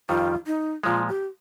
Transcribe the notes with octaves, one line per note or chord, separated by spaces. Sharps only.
F2 D#3 G3 F4
D#4
A#2 F3 G#3 F4
G4